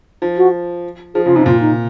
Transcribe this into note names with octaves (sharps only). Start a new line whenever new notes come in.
F3
F#4
F3 G#4
C#3 F4
C3 D#4
A#2 F4
D#4